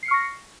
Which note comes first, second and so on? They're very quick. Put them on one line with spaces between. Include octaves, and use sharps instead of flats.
C7 C#7 F6 C#6 A#6